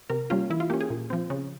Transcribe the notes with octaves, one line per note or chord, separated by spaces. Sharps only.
C3 A#4
G3 A#3 C#4 F4
E3 E4
F4
A#3 C#4 G4
G#4
A#2
F3 C4
C#3